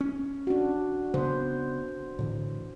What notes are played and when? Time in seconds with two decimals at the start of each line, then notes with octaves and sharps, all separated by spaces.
0.01 C#4
0.47 D4 F#4
1.14 C#3 B3 C5
2.19 A2 D3 E3